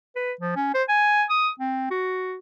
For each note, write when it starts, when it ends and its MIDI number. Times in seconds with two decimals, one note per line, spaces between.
0.16 0.32 71
0.41 0.54 53
0.55 0.72 61
0.74 0.83 72
0.89 1.23 80
1.30 1.49 87
1.60 1.87 60
1.90 2.37 66